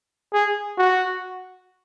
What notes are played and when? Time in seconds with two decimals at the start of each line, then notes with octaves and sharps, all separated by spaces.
0.33 G#4
0.78 F#4